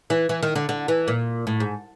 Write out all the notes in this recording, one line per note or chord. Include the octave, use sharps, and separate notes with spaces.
E3
E3
D#3
D3
D3
E3
A#2
A2
G#2